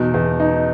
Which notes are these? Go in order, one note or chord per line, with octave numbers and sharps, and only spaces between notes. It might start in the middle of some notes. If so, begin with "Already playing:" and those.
Already playing: E2 B2 D#4
E2
D#4